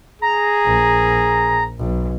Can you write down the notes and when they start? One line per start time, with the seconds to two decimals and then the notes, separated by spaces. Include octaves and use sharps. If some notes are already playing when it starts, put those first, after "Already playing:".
0.22 G#4 A#5
0.65 A#1
1.79 B1